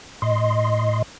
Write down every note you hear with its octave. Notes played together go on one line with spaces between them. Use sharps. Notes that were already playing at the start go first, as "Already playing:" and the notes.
A2 D#5 C6